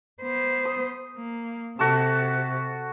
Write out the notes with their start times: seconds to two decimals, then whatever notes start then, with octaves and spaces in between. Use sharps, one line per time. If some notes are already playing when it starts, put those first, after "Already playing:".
0.22 B3 C5
0.65 D#6
1.17 A#3
1.79 C3 F#4 A4 E6